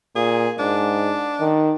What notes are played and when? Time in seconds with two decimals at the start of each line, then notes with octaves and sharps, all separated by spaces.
0.16 A#2 G#4
0.59 G#2 D4
1.41 D#3